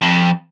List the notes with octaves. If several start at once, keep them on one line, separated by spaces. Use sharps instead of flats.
F2